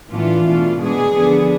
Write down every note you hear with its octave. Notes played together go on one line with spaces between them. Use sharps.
A2 E3 B3 D4 F4
B2 A3 D4
B2 G#3 B3 D4 G#4
D3 F3 B3 D4